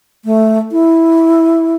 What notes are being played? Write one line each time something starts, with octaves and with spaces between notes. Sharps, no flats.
A3
E4